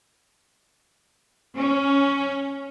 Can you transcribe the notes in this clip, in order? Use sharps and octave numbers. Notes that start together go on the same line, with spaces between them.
C#4